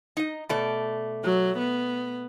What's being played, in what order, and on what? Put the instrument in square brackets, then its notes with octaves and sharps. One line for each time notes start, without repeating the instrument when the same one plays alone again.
[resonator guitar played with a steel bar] D#4 D#5
B2 A3 D5
[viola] F#3
B3